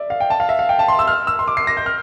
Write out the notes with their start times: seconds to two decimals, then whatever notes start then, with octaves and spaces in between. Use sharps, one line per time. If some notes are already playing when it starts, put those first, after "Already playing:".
Already playing: D5 E5
0.10 F5
0.20 G5
0.30 A5
0.40 F5
0.49 E5
0.59 F5
0.69 G5
0.79 A5
0.88 C6
0.99 E6
1.08 F6
1.27 E6
1.39 C6
1.48 D6
1.57 C7
1.67 A#6
1.77 G6
1.86 F6